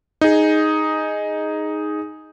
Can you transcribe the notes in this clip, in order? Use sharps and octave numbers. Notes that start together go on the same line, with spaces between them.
D#4 G#4